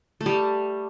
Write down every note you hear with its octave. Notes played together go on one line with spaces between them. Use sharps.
A3
G3